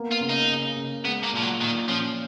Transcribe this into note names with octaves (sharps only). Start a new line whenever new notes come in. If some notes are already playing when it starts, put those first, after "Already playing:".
Already playing: A#3 B3
F4
C#3
D#4
C#3
C#3
G#3 B3
A#3
A#2 F3
F#3
A#2 D#3
F3 C#4